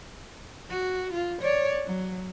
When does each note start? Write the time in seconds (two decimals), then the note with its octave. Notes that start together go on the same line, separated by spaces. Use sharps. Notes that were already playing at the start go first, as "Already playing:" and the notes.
0.70 F#4
1.13 F4
1.42 C#5 D5
1.86 F#3